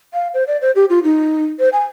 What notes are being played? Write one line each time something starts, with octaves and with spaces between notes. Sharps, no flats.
F5
C5
D5
C5
G4
F4
D#4
C5
G#5